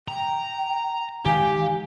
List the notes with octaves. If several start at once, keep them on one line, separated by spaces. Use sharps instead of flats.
G5 A#5
D#3 E3 G#3 G4 F5 G#5